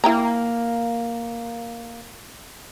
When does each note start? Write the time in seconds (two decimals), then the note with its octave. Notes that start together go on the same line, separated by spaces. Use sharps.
0.04 A#3 E4 G5 A#5